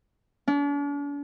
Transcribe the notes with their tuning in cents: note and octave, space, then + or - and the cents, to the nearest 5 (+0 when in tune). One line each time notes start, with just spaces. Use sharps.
D4 -45